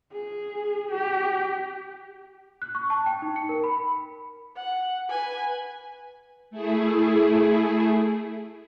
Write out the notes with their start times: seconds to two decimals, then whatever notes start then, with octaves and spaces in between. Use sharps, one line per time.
0.13 G#4
0.91 G4
2.62 F#6
2.75 C#6
2.90 A5
3.06 G5
3.22 D#4
3.36 C#7
3.49 A#4
3.64 B5
4.56 F#5
5.09 B4 G#5
6.51 A3 E4 G#4